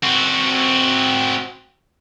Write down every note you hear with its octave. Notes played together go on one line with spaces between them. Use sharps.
C4 F#4